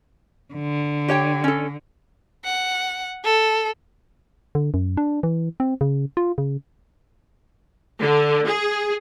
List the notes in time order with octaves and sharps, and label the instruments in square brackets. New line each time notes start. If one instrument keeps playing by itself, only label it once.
[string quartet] D3
[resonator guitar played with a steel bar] G4 C#5 G5
C#4 A4
[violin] F#5
A4
[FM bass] D3
F#2
D4
E3
C4
C#3
F4
C#3
[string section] D3
G#4